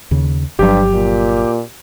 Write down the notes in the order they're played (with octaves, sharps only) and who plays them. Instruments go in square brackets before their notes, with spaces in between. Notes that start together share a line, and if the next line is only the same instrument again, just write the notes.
[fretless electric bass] D#2 C#3
[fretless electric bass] G1 F3 F#3 [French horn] G2 [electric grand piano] G4
[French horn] A#2